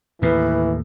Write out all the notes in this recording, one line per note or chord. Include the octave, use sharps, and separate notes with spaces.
D#2 A2 E3 B4